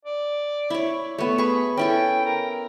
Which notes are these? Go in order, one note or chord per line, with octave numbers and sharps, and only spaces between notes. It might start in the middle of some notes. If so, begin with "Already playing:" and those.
D5
E4 C#5
A3 B3 C#5
G#4 B5 C#6
C#4 E4 A4 G5
A#4